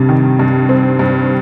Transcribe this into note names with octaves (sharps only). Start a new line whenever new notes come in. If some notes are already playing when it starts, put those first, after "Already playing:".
Already playing: G2 C3 G3
D#3
G2
C4
G2